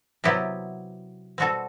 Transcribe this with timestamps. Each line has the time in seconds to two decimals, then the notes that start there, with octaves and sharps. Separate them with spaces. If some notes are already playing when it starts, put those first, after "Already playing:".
0.24 C3 F#3 B3 E4 G4
1.38 B2 G3 C4 F#4 A4